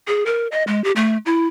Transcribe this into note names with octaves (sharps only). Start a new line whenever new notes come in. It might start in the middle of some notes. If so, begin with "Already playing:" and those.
G#4
A#4
D#5
G#3
G4
A3
E4